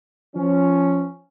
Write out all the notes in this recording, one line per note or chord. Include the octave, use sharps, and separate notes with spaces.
F3 C#4